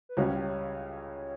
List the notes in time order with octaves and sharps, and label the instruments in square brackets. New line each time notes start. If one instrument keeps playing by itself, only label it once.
[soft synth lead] B4
[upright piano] C#2 C#3 G3 C#4 F#4 [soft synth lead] C#5